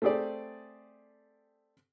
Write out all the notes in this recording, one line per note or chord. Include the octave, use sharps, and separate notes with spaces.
A3 C4 G4 G#4 D5